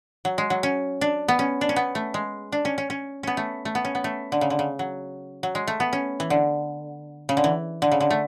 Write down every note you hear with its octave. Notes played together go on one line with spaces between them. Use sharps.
F#3
G#3
F#3
C#4
D4
B3
C#4
D4
C#4
B3
A3
G#3
D4
C#4
C#4
C#4
B3 C#4
A3
A3
B3
C#4
B3
A3
D3
C#3
D3
C#3
F#3
F#3
G#3
A3
B3
C#4
E3
D3
C#3
D3
E3
D3
C#3
D3
A3